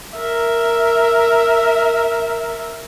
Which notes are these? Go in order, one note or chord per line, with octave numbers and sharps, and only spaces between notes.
A#4 E5